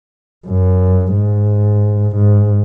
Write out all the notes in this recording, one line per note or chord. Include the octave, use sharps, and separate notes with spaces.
F#2
G#2
G#2